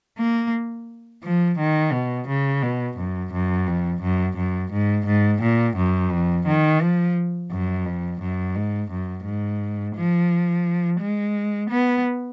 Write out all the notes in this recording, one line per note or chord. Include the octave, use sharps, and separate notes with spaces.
A#3
F3
D#3
B2
C#3
B2
F#2
F#2
F2
F#2
F#2
G#2
G#2
A#2
F#2
F2
D#3
F3
F#2
F2
F#2
G#2
F#2
G#2
F3
G#3
B3